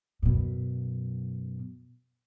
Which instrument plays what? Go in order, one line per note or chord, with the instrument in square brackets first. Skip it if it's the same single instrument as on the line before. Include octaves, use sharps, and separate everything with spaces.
[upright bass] F#2 B2